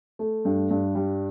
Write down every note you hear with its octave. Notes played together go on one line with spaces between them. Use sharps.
A3
G2
G2
G3